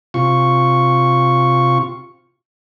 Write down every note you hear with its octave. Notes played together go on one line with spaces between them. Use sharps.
C3 F4 C#6